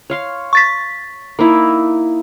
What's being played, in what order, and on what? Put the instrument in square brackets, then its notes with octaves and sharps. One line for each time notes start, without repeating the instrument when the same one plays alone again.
[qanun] C#5 F5 C6
[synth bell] C#6 A6 B6
[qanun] A#3 D#4 E4